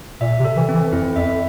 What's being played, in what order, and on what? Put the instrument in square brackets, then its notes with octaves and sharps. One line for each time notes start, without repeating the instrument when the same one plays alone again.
[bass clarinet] A#2 [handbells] E5
[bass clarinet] C3
[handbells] A4
[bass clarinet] E3
[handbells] C4
[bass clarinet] E3
[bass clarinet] F2 [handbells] E4
[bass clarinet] F2 [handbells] E5